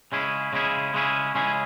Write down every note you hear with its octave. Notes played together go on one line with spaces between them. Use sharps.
C#3 G#3 C#4 E4 G#4
C#3 G#3 C#4 E4 G#4
C#3 G#3 C#4 E4 G#4
C#3 G#3 C#4 E4 G#4